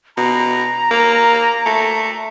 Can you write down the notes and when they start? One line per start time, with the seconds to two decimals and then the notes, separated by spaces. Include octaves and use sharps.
0.17 B2 A#5
0.91 A#3
1.66 A3